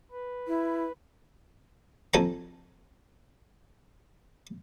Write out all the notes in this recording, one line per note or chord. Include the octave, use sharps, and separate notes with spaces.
B4
E4
F2 A4 G#5 A#5